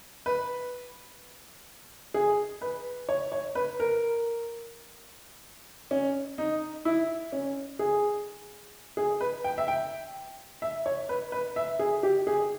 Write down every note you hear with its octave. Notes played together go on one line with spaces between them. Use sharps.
B4
G#4
B4
C#5
C#5
B4
A#4
C#4
D#4
E4
C#4
G#4
G#4
B4
G5
E5
G5
E5
C#5
B4
B4
E5
G#4
G4
G#4